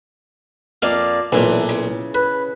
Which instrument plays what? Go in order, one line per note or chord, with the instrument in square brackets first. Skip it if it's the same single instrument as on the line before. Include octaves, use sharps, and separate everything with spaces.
[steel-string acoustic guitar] F2 A#3 D5 [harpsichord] F5
[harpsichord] B1 A#2 [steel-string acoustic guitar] E3 D4
[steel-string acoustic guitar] C#3
[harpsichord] B4